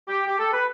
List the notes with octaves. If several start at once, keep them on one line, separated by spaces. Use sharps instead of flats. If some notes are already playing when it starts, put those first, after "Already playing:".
G4
G4
A4
B4